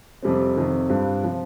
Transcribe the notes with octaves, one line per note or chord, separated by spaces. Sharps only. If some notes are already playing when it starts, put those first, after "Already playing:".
F2 C3 G3 C4
F2 C3 D#3
G2 G3 C4 F4
C3 F3